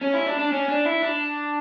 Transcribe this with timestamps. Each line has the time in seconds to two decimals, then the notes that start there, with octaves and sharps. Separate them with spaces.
0.01 C#4
0.14 E4
0.26 D4
0.39 D4
0.52 C#4
0.68 D4
0.85 E4
1.02 D4